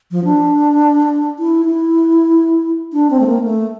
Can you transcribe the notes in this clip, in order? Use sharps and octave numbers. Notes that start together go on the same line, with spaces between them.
F3
D4
E4
E4
D4
C4
A3
A#3
A3